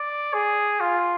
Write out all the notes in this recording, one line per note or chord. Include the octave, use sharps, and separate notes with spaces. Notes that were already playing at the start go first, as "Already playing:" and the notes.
Already playing: D5
G#4
F4